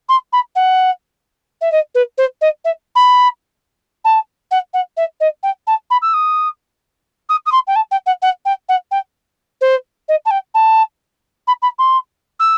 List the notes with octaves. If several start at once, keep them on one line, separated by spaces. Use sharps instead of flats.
C6
B5
F#5
E5
D#5
B4
C5
D#5
E5
B5
A5
F#5
F#5
E5
D#5
G5
A5
B5
E6
D#6
D#6
D#6
C6
G5
A5
G5
F#5
F#5
G5
F#5
G5
C5
D#5
A5
G5
A5
B5
B5
C6
E6